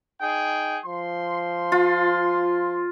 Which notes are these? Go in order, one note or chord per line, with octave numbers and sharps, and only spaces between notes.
D#4 G#4 G5
F3 C6
F4